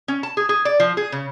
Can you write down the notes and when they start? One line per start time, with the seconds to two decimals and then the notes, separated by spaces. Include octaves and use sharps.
0.08 C#4
0.23 A5
0.37 G#4
0.49 G#4
0.65 D5
0.80 F3
0.97 G#4
1.12 C#3